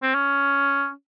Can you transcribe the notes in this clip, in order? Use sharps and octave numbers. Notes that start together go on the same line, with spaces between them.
C4
C#4